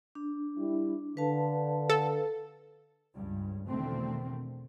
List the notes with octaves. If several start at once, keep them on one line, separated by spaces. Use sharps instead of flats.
D4
G3 E4
D3 B4 F5 A5
A4
C#2 G2
E2 B2 D3 D#3 A3 C4